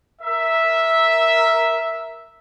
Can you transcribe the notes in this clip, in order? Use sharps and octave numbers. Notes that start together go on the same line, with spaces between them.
A#4 E5